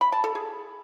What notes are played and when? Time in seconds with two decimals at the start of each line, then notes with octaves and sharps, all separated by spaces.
0.01 B5
0.12 A5
0.24 A4
0.35 G#4